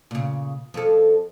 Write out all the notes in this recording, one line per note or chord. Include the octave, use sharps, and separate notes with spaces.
A#2 C#3
F2 A4